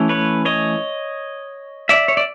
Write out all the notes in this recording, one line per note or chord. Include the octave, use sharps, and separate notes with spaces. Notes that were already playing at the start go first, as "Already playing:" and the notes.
Already playing: E3 A3 C#4
B4 C#5
C#5 D#5
D5 E5
C#5
D5